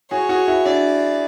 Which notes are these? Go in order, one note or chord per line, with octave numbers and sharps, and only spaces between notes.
F#4 G#4 C#5
F#4 G#4
E4 F#4
D4 E4 D5